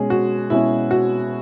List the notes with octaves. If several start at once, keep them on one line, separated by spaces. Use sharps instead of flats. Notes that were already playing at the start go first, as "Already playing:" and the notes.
Already playing: B2 G#3 C#4 G#4
F#4
B2 G#3 C#4 E4
F#4